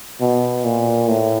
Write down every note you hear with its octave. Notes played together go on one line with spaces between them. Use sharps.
B2
A#2
A2